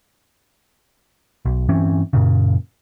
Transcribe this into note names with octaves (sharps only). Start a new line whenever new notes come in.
B1
G2 E3 C4 C#4
F#2 A#2 C#3